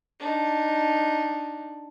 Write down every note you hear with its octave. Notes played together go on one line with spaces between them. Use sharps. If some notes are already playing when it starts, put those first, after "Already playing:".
D4 D#4